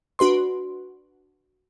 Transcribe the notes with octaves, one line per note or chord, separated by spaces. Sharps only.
D4 F#4 B4 C6